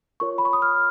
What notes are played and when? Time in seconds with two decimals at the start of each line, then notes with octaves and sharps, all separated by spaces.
0.20 F4 A#4 C#5 C#6
0.38 B5
0.45 C#6
0.53 D#6
0.62 F6